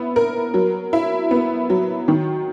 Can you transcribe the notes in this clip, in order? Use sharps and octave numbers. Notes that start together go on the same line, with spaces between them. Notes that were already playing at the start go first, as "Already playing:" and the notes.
Already playing: B3 E4
A#4
F#3
E4
B3
F#3
D#3